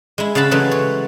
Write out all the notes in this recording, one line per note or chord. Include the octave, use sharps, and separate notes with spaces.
G#3 E4
C#3 F5 F#5 A5 B5
C#3 E3 F#3 G#3 A3
C#5